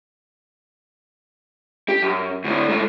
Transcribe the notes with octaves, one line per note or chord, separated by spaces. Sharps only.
G4
F#2
D2 A2
G#2 A3